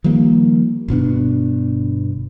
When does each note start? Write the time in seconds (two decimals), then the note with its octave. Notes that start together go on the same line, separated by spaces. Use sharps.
0.04 D#3 F3 G3 A#3
0.88 G1 B2 B3 D4